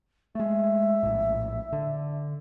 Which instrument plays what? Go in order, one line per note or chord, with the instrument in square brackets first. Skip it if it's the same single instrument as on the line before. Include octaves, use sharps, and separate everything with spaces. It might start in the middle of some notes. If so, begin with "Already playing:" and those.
[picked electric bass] G#3 A3 [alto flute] E5
[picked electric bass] A#1 A2
D3